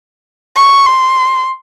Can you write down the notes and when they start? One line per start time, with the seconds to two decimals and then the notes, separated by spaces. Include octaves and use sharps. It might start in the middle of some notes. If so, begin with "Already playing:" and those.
0.56 C#6
0.86 C6